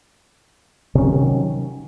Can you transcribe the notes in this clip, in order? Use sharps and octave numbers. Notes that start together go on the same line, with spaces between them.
C3 D#3 F#3 C#4